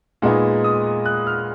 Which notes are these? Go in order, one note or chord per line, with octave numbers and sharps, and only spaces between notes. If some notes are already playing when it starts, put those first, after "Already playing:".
A#2 G#3 B3 D#4 F#5
D#6
F#6
F6